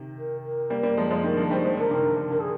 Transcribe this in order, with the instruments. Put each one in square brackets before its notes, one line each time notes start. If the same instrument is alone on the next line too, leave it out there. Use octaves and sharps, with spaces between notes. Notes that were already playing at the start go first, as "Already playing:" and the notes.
Already playing: [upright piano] C3 D#3
[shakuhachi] A#4
A#4
[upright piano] G3 A#3
G3 A#3
F3 G#3
F3 G#3
[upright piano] D#3 G3 [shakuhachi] A#4
[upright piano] D3 F3
[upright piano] D#3 G3 [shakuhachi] C5
[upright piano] F3 G#3
[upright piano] D3 F3 [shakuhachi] A#4
[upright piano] C3 D#3
D3
C3
[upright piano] D3 [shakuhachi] A#4
[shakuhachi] G#4